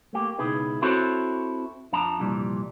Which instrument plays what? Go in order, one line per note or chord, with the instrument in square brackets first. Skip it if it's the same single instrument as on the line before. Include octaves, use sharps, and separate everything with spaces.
[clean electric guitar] A3 A#3 G4
C#2 B2 D#4 E4 G#4 B4
C4 E4 F#4 A4 C5 C#5
F2 F3 D4 A5 A#5
C2 F2 A#2 E3 G3